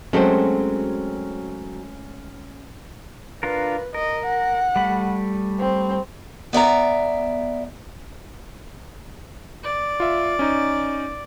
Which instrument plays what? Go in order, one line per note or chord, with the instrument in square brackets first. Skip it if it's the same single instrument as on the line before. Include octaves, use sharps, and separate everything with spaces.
[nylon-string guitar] F#3 F#4 C5 [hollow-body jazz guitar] G#3 A3 C4 [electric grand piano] C#4
[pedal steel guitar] D4 F4 A#4 [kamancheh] B4
[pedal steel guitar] A#4 [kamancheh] D#5
[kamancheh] F#5
[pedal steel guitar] G3 A3 B5
[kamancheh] C4
[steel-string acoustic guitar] B3 D5 E5 A#5
[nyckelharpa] D5
[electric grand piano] F4 E5
C#4 D#4